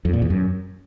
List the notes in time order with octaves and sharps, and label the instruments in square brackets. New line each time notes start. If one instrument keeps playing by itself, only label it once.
[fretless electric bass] F2
A#2
E2
F#2